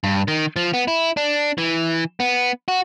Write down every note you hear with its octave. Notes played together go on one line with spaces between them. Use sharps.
G2
D#3
F3
B3
E4
D4
E3
B3
F#4